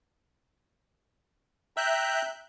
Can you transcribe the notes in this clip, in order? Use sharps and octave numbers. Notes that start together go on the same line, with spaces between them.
E5 G5 A#5 F#6 G6